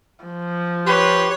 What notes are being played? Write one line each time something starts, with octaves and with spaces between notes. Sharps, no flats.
F3
G4 B4 C#5 C6